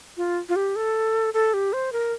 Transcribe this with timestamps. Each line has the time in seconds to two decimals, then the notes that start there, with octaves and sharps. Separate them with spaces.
0.17 F4
0.49 F4
0.56 G4
0.76 A4
1.34 A4
1.54 G4
1.73 C5
1.93 A#4